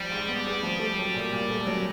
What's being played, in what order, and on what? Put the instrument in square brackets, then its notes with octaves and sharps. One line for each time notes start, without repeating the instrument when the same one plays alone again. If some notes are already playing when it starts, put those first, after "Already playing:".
Already playing: [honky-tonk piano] F3 [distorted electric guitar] G3
[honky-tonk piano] G#2
B3
G#3
F3
A3
F#3
A#2
A#2
A3
F#3